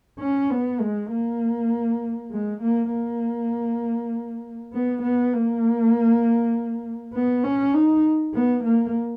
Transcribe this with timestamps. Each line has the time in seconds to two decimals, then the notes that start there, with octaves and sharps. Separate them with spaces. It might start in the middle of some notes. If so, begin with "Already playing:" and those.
0.20 C#4
0.50 B3
0.80 G#3
1.10 A#3
2.31 G#3
2.62 A#3
2.91 A#3
4.73 B3
5.02 B3
5.33 A#3
7.13 B3
7.44 C#4
7.74 D#4
8.34 B3
8.64 A#3